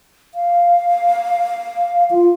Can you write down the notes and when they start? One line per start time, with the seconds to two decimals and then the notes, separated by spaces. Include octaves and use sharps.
0.35 F5
2.11 F4